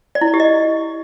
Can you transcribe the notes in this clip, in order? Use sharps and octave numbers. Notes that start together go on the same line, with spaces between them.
D5
E4
D5
G4
D#5